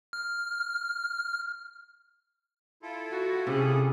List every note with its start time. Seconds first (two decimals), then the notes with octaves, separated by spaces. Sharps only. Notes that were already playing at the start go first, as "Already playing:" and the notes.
0.13 F6
2.83 E4 F4 A4
3.11 F#4
3.47 C3 C#4 G#4